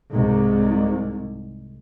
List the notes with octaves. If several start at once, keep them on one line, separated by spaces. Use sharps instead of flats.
C2 G#2